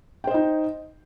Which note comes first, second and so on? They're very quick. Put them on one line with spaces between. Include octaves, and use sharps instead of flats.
G5 C5 D#5 D#4